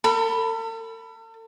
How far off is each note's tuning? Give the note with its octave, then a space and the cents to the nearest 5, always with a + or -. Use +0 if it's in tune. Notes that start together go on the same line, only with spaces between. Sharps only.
A4 +45 B5 +0